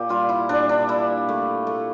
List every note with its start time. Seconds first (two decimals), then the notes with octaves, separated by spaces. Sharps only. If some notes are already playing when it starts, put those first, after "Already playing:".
Already playing: A#2 A#3 G4
0.09 G3 F4
0.29 E4
0.49 A#2 D4
0.69 D4
0.88 A#2 E4
1.29 A3
1.67 A3